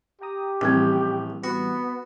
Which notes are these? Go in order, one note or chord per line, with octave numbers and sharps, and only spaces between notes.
G4 G5 A#5 D#6
A#1 A2 E3 G3 C4 C#4
B3 F#4